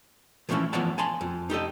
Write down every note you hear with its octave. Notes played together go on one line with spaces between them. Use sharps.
E3 F3 A3 A#3 C#4 E4
E3 F3 B3 C#5 F#5 A5
G#5 A5 C6
F2
D#4 G4 A4 D#5